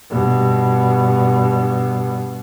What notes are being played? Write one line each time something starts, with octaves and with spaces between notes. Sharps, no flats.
G2 B2